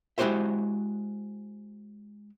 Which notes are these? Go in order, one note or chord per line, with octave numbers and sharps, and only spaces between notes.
G#3 E4 F#4 G4 C5 E5